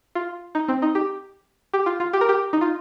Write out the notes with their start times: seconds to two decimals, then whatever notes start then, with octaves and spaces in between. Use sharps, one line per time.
0.15 F4
0.55 D#4
0.68 C4
0.82 D#4
0.95 G4
1.74 G4
1.86 F4
2.00 F4
2.13 G4
2.21 A#4
2.29 G4
2.53 D#4
2.61 F4